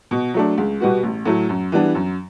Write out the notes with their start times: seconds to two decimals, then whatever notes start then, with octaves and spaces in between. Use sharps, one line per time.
0.11 B2
0.34 F#3 A3 D4
0.58 C#2
0.80 B2 G3 B3 F#4
1.03 A1
1.26 A2 F#3 A3
1.49 F#2
1.72 E3 G3 B3 D4
1.95 F#2